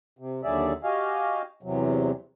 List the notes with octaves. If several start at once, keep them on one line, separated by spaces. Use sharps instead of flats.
C3
D#2 D3 F#3 G#4 D5 E5
F#4 G4 D#5 F5 G#5
E2 C3 F#3